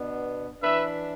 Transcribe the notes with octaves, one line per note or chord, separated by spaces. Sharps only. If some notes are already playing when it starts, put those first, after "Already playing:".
Already playing: B2 B3 D4
E3 D4 B4 E5